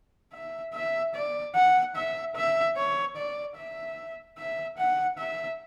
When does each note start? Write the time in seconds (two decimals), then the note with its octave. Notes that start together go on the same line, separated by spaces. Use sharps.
0.33 E5
0.74 E5
1.15 D5
1.55 F#5
1.96 E5
2.35 E5
2.77 C#5
3.16 D5
3.57 E5
4.38 E5
4.78 F#5
5.18 E5